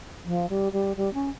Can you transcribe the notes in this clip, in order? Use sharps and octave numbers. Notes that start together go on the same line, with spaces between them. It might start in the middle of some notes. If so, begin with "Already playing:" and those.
F3
G3
G3
G3
C#4